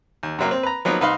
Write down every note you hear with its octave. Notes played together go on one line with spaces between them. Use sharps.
D#2
F#2 C3 F#3 A#3
C4
B4 A#5
F3 F#3 A#3 B3 D#4
C2 D#4 B4 F5 C6